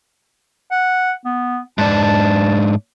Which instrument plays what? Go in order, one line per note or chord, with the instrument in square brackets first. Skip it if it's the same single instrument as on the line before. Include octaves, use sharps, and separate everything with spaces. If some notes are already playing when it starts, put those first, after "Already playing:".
[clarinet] F#5
B3
[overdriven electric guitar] G#2 D4 [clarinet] A5
[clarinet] A5